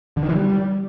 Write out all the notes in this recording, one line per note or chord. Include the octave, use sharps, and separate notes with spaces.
D3
D#3
E3
G3